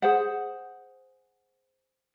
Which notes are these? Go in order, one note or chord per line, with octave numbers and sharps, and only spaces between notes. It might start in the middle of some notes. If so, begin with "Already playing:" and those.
G#4 C5 F#5